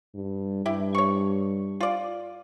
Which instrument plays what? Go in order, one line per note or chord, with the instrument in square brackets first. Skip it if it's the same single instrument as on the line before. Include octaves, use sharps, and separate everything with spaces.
[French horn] G2
[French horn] G2 [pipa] E4 G4
[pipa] C#5 C#6
F4 D5